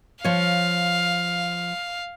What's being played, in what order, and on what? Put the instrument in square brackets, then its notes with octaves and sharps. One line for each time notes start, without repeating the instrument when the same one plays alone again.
[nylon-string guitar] F3 C#5 [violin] F5